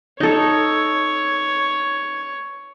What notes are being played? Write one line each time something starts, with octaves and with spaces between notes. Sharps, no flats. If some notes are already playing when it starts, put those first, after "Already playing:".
D#4 A4 C#5